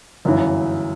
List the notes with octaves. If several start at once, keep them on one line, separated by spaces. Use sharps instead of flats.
G1 F#2 E3